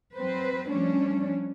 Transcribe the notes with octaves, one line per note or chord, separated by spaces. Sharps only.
F#3 C4 B4 C5
F3 G3 A3 C#4 D4